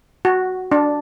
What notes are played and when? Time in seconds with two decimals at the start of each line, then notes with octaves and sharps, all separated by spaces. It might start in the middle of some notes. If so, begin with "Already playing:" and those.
0.25 F#4
0.72 D4